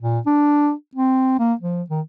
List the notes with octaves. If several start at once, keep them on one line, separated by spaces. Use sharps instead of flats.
A#2
D4
C4
A#3
F3
D#3